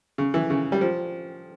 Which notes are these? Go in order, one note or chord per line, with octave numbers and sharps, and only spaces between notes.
C#3
E3
C#3
G3
F3